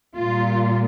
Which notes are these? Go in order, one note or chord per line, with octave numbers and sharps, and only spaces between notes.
A#2 G3 A#3 F4